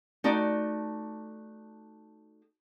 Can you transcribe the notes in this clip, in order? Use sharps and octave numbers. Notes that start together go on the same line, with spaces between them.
A3 D#4 F#4 D5